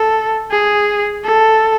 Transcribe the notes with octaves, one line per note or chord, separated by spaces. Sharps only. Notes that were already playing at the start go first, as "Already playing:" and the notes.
Already playing: A4
G#4
A4